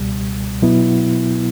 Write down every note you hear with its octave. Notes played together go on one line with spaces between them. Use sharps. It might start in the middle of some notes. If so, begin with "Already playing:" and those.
Already playing: C#2 B2 G3
B2 F#3 B3 E4